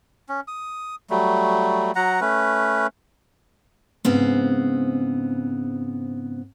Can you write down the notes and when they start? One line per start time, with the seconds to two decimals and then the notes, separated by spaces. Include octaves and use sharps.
0.29 C#4
0.48 D#6
1.10 F#3 G3 A3
1.96 F#3 F#5 A#5
2.21 A3 C#4 B4
4.05 G#2 C#3 B3 C4